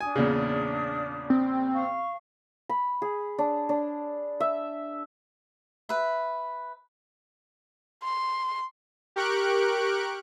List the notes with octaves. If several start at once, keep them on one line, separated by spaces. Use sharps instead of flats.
D4 G#5 D#6
E2 A#2 C#3
C4
F5 C#6
B5
G#4
D4
D4
E5
B4 E5
C6
G4 A#4 C#6 F#6 D7